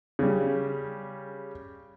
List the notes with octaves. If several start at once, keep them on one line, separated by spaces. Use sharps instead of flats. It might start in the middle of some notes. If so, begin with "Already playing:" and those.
C#3 G3